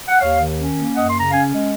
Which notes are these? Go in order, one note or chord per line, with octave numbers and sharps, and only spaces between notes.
F#5
D#2 C#5 F5
D#3
C#4
A#3
F#2 D#5 F#5
C6
C#3
A#5
C#4 F5 G#5
G#3